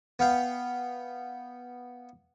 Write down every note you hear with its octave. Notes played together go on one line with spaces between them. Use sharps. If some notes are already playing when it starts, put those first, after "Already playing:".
B3 F5 G5